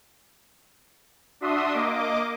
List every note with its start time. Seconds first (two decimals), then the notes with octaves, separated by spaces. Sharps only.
1.41 D4 F#4 E5 C6 D#6
1.73 A#3 D#5 D6